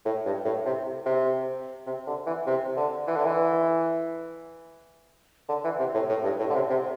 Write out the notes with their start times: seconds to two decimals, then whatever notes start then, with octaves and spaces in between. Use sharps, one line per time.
0.05 A2
0.25 G2
0.45 A2
0.65 C3
1.05 C3
1.86 C3
2.07 D3
2.26 E3
2.47 C3
2.76 D3
3.07 E3
3.16 D3
3.25 E3
5.49 D3
5.64 E3
5.79 C3
5.94 A2
6.09 A2
6.24 G2
6.39 A2
6.50 D3
6.55 C3
6.69 C3